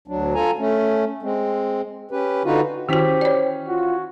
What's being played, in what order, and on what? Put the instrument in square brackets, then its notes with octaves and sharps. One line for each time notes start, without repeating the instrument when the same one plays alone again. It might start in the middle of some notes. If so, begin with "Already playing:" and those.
[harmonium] D2 F#3 D4
F4 A4 G#5 A#5
A3 C#4
G#3 C4
C#4 G4 B4
D3 D#4 F4 F#4 B4
[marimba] D#3 F#4 [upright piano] E3 C#4 B6 [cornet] G4 [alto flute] C5
[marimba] C#5 D5
[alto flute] F4 [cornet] F#4